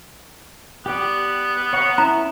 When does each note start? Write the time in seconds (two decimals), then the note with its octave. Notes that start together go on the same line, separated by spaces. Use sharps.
0.86 B3 G4 D5
1.73 C#5 F#5 A#5
1.98 C#4 E4 A#5